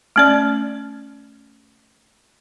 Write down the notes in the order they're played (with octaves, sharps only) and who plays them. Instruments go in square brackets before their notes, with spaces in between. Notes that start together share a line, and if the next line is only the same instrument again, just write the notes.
[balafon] A3 C#4 D5